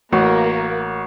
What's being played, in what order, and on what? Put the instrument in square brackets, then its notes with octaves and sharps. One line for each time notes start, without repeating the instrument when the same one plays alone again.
[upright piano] A1 [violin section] A#3 [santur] F#4